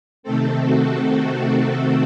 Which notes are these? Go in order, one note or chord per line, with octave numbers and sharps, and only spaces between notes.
C3 D#3 A3 C4 A4
F#4